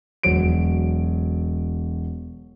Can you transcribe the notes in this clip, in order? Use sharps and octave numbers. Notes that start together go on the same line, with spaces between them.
E1 F#3 D7